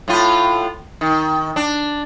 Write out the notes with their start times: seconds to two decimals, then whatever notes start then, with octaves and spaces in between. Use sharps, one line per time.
0.08 A2 F4
1.01 D#3
1.56 D4